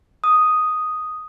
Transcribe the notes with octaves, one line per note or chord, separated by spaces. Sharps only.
D#6